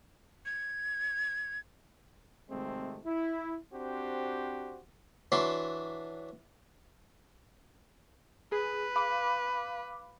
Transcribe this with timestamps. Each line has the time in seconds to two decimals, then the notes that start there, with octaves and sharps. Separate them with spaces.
0.46 G#6
2.49 G#1 C3 G#3 A3 C4
3.05 E4
3.72 C4 D4 F#4 G4 C5
5.32 E3 F#3 D4 E5 B5 C6
8.52 G#4 B4
8.96 F5 B5 D6